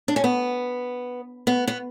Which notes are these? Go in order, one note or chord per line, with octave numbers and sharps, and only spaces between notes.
D4
C#4
B3
B3
B3